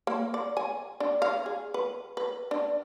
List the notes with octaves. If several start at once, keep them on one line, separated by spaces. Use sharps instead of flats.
A#3
D5
G#5
D4
F5
G#4
B4
B4
D4